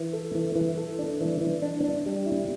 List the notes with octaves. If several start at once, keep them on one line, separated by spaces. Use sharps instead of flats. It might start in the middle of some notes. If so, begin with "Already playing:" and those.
Already playing: E3
A4
E3
E3
A4
D4
E3
E3
D4
D4
G3
E4